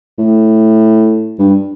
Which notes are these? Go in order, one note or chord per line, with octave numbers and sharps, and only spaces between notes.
A2
G2